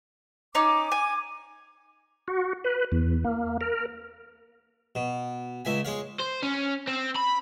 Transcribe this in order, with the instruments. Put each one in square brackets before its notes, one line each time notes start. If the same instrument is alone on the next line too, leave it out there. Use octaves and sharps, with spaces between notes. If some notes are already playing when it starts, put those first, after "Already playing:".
[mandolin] C#4 D#4 [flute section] D6
[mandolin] G#5
[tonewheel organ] F#4
B4
E2
A#3
A#4
[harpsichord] B2
C#2 E5 G#5
G#3 C#5 F5
[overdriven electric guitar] C5
C#4
C4
B5